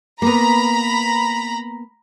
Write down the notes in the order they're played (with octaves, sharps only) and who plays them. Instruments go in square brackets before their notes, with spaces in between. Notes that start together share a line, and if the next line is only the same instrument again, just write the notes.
[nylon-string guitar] A#3 B3 [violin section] A#5 B5